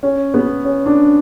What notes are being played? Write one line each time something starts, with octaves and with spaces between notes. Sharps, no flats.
C#4
B3
C#4
D4